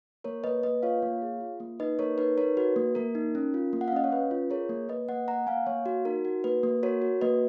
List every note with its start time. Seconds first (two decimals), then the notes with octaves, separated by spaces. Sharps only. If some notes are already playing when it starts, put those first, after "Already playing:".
0.24 A#3 A#4 C#5
0.44 A#3 B4 D#5
0.63 A#3 B4 D#5
0.83 F4 C#5 F5
1.02 A#3
1.22 G#4
1.41 F4
1.60 A#3
1.80 D#4 B4 D#5
1.99 A#3 A#4 C#5
2.18 D#4 B4
2.38 D#4 A#4 C#5
2.57 F#4 B4
2.76 A#3
2.95 A#3 A#4
3.15 D#4
3.35 C#4
3.54 F4
3.73 A#3
3.81 F#5
3.88 F5
3.92 C#4 D#5
4.04 C#5
4.11 C#4 B4
4.31 F4
4.50 G#4 A#4 C#5
4.69 A#3
4.89 A#3 B4 D#5
5.09 A#3 D#5 F#5
5.28 A#3 F#5 A#5
5.47 A#3 F5 G#5
5.66 A#3 C#5 F5
5.86 F#4
6.05 D#4 A#4
6.25 F#4
6.44 A#3 B4
6.63 A#3
6.83 F#4 A#4 C#5
7.02 F#4
7.21 A#3 B4 D#5